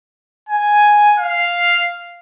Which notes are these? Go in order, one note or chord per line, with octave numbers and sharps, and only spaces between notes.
G#5
F5